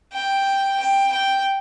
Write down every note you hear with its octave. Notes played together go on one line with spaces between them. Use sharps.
G5
G5
G5